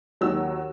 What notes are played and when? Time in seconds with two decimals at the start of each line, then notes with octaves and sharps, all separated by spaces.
0.21 D#2 D#3 F#3 E6